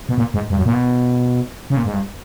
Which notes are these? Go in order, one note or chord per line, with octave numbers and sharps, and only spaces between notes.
B2
A#2
G#2
G2
F#2
A#2
B2
C#3
A#2
G#2
G2